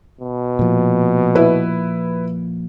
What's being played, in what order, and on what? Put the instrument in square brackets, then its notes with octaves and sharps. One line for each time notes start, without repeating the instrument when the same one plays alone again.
[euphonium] B2
[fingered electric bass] A#2 F3
[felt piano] E4 B4